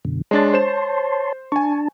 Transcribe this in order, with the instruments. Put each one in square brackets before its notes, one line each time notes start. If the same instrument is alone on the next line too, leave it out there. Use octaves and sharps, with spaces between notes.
[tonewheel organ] F#2 B2 D3
[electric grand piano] G#3 D4 A6 [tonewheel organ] C#5 A5 C6
[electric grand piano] C5 E7
[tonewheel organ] D4 A5 [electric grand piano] G#5 C#6